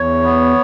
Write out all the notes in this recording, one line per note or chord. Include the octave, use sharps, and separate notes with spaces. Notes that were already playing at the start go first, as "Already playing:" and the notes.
Already playing: E2 C#5
B3